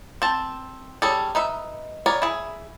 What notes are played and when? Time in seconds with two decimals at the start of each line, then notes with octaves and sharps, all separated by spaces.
0.22 C4 A5
1.02 G3 C#4 G#4 A4
1.35 D#4 B4 E5
2.06 B3 A#4 C#5 D5
2.22 E4 G#4